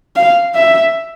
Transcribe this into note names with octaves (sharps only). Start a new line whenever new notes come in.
F5
E5